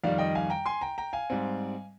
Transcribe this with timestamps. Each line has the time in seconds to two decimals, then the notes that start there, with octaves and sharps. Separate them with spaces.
0.04 F2 D#3 G3 D5 F5
0.18 D#5 G5
0.35 F5 G#5
0.50 G5 A#5
0.66 G#5 C6
0.81 G5 A#5
0.98 G5 A#5
1.13 F5 G#5
1.30 G#2 G3 C4